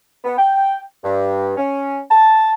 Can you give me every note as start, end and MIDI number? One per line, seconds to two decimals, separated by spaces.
0.24 0.36 59
0.38 0.80 79
1.04 1.53 43
1.57 1.99 61
2.10 2.54 81